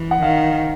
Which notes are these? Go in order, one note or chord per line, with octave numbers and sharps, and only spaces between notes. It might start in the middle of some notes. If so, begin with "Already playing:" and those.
Already playing: E3
F#5
D#3 F5